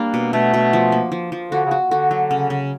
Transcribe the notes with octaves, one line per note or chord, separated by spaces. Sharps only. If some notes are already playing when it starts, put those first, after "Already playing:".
Already playing: G3 A#3 D4
B2
B2 A3
B2
F3
A#3
F3
F3
D3 F#4
C#3
F#4
D3 F#4
F#3
C#3
C#3